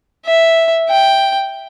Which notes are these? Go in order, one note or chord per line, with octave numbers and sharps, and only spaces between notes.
E5
G5